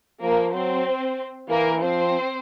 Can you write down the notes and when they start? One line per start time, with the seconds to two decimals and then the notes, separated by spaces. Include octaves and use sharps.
0.21 F3 A#3 A#4
0.53 F#3 C4 C5
1.49 E3 A#3 A#4
1.81 F3 C4 C5